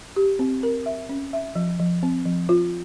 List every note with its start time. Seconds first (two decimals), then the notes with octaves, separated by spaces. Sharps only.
0.16 G4
0.39 C4
0.63 A#4
0.86 E5
1.09 C#4
1.33 E5
1.56 F3
1.80 F3
2.03 C4
2.25 F3
2.49 F4